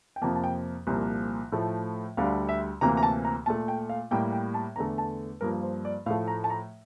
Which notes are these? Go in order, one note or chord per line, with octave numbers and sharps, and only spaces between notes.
G5
F2 C3 F3 A#3 A5
A5
G5
C2 A#2 F3 A#3
A2 F3 A3
D2 D3 G3 F5
E5
D2 C3 E3 A#3 A#5
A#5
A5
A#5
A#2 A3 A5
G5
F5
A2 G3 A#3 G5
G5
A5
E2 D3 A3 A#5
A5
G2 F3 A#3 A#4
C5
D5
A2 F3 A3 F5
A#5
A5
A#5